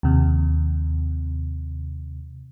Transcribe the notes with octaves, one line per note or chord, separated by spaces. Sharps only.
D#2 C3